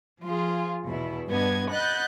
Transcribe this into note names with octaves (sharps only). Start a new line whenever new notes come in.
F3 F4 G#4
E2 B2 E4
G2 B3 D4 D#5 G#6
D#5 F#5 B5 F#6 G6 A6